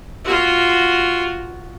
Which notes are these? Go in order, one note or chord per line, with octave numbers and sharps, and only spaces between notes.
F4 F#4